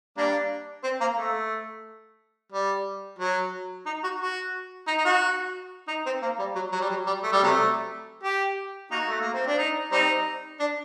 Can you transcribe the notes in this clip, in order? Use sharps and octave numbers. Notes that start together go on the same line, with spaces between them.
G3 A#3 D4
C4
A#3
A3
G3
F#3
D#4
F#4
F#4
D#4
D#4
F#4
D#4
C4
A#3
G3
F#3
F#3
G3
F#3
G3
A3
G3
C3 F#3 A3
G4
A#3 D#4 F#4
A3
A#3
C4
D4
D#4
G3 C4 D#4
D4